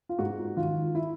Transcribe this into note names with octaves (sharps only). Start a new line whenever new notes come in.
F4
G#2 F#4
D#3 F4
E4